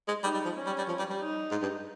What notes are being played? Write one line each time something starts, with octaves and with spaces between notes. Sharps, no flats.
G#3
G3 D#4
G3
F3
C#4
G3
G3
F3
G3
G3
D#4
G#2
G2